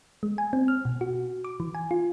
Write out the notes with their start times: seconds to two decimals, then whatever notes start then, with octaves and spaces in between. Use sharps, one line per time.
0.23 G#3
0.38 G#5
0.53 C4
0.68 F6
0.85 B2
1.01 F#4
1.44 D6
1.60 E3
1.75 G#5
1.91 F4